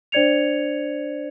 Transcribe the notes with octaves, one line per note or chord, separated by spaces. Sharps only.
D4 C5 D5 G#6 C#7 F7